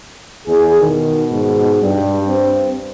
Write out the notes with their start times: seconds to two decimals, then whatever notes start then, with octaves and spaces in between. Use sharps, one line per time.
0.47 E2 G#4
0.80 B2 D#3
1.32 G#2
1.82 G2 G3
2.28 C4